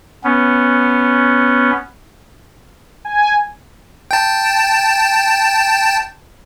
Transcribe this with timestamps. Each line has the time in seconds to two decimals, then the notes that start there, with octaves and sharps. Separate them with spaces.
0.24 B3 C#4
3.05 G#5
4.11 G5 A5